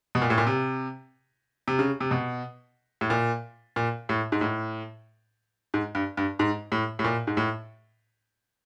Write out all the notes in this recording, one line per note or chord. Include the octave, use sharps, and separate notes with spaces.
B2
A#2
A2
A#2
C3
C3
C#3
C3
B2
A2
A#2
A#2
A2
G#2
A2
G#2
G2
G2
G#2
A2
A2
A#2
G#2
A2